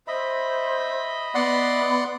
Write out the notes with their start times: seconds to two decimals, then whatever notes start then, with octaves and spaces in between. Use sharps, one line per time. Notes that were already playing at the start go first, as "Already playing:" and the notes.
0.08 C5 D#5 E5 B5
1.35 B3 D5 F#5 C6